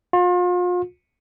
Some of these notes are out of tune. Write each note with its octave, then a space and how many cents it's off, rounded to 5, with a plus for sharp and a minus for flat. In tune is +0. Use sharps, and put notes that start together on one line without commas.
F4 +40